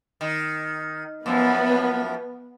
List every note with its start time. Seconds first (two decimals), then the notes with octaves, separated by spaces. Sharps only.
0.21 D#3
1.26 F#2 F3 B3